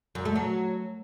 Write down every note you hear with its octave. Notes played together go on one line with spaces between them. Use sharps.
F#2
A3
F#3